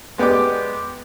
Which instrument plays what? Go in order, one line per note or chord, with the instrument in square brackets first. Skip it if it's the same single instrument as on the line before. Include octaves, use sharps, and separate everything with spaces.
[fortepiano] G#3 B3 G4 D5 D6